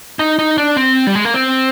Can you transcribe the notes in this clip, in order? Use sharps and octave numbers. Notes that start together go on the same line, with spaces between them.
D#4
D#4
D4
C4
G3
G#3
A#3
C4